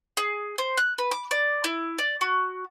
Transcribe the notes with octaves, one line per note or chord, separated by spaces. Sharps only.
G#4
C5
F#6
B4
D6
D5
E4
D5
F#4